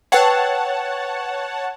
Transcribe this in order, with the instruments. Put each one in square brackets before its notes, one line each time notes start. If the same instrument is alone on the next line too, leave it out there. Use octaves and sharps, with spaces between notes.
[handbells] B4 G5 [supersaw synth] C#5 F#5 A5